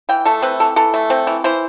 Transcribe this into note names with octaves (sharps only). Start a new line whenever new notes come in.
E3 G5
A3 A4
C4 B4
E3 A4
E3 A4
A3
C4
E3
E3 C5